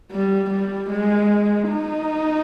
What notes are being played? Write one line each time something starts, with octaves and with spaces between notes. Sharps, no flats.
G3
G3
G#3
D#4